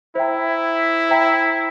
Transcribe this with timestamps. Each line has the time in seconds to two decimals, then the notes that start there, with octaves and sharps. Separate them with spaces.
0.15 E4 C5 E5 G5 A#5
1.09 C5 E5 G5 A#5